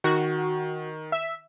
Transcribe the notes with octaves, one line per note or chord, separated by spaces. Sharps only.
D#3 F#4
E5